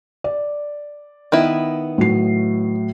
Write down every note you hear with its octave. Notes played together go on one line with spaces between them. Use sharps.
D5
D#3 B3 E4
A2 F#3 C7